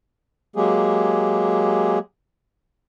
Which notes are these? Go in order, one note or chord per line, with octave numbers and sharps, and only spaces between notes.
F#3 G#3 A#3 G4 G#4